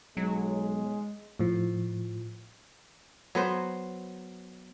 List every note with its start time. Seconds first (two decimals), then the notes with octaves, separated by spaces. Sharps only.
0.17 B1 F#3 G#3
1.39 A2 F3
3.35 F#3 B3 C5